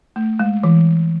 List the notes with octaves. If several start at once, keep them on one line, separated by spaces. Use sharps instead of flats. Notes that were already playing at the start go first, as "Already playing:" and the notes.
A3
G#3
E3